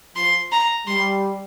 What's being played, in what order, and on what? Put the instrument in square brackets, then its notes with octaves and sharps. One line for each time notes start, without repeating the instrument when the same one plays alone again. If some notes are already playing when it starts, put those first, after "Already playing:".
[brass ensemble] F3 [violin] C6
[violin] A#5
[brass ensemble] G3 [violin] C6